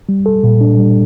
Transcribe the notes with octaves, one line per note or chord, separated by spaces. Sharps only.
G3
A4
A#2
D4
G3